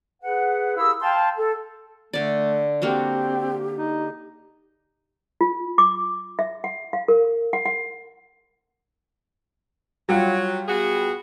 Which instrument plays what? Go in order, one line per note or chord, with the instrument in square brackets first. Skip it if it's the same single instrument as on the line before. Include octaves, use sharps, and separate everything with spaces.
[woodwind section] G#4 B4 F#5
E4 G4 G#4 A#4 F5 E6
F5 G5 A5 C6
A4
[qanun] D3 D5 [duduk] A3
[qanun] A#3 D4 F#4 [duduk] C4 [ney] G4
[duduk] D#4
[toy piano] F4
D6
E5
F#5
F5
A#4
F#5
F#5
[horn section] F#3 [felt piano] G3 F4
[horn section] B3 F#4 G#4